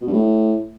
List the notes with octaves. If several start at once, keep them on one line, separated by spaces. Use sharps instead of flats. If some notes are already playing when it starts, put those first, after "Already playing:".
B2
G2
A2